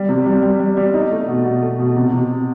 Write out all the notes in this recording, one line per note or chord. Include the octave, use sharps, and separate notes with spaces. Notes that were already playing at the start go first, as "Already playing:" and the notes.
Already playing: G3
C3
G3
G3
G3
G3
D#4
A3
B2
B2
A3
B2
C3
C3